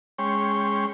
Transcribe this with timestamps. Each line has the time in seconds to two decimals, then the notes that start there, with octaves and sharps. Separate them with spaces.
0.19 G#3 C#4 C#5 G5 C6